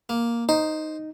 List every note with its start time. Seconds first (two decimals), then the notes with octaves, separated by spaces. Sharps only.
0.09 A#3
0.49 D#4 C5